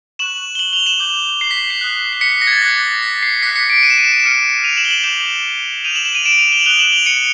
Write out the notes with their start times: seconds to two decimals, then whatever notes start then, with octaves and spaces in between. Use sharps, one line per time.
0.19 C#6 F#6 E7 F#7
0.55 G7
0.59 E7 F#7
0.73 F7 G7
0.86 E7 F#7
1.00 D6 G6
1.41 C7
1.51 B6
1.70 C7
1.81 D#6 F#6
2.13 C7
2.21 B6 C#7
2.31 C7
2.41 A#6
2.47 G#6
2.52 A6
2.62 D6 F#6 A#6
3.03 B6
3.23 C7
3.42 D6 F#6 B6 C#7
3.55 B6 C#7
3.70 C7 D7
3.83 D#7
3.90 E7
3.98 D#7
4.05 E7
4.12 D#7
4.20 E7
4.24 D6 F6 C#7 D#7
4.63 D#7 F7
4.77 E7 F#7
4.85 G7
4.90 E7 F#7
5.04 D6 G6 E7 F#7
5.84 D#6 G6 D#7 F7
5.95 E7 F#7
6.05 E7 F#7
6.15 D#7 F7
6.25 D7 E7
6.38 D#7 F7
6.52 F7 G7
6.60 F#7
6.66 D#6 F#6 F7 G7
6.79 E7 F#7
6.93 F7 G7
7.06 C#7 D#7